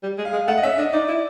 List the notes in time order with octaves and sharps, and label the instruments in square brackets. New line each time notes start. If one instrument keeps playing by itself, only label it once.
[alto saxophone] G3
G#3
[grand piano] F5
[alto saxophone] G#3
[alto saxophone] A3 [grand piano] F#5
[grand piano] D#5
[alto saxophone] C#4 [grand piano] E5
[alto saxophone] D4 [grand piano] D#5
[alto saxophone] D#4 [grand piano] D5
[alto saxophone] E4